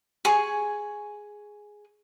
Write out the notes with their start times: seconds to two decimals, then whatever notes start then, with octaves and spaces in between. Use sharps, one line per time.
0.25 G#4 G#5 C#6